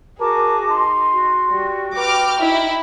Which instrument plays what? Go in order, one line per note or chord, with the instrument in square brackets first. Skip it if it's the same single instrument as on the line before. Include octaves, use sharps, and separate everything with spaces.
[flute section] F#4 A5 D6 [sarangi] G#4 [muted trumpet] A#4
[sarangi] D#4 [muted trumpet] C6
[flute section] F#4
[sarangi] G3
[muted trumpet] B4 [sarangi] G5 [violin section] D6 F6
[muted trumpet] D#4 [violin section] E4